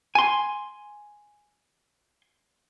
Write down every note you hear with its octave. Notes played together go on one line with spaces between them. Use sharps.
G#5 C6